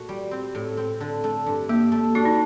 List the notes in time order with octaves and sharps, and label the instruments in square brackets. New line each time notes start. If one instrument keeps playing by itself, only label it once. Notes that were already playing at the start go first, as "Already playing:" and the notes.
Already playing: [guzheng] A#2 A3 F#4
G3
C4
A2
C4
D3
A3
G2
[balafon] A#3 [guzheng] G4
[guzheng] A3
[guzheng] D4 [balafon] F#4
[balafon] D#4